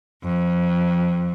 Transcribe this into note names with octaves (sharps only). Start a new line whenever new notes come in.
F2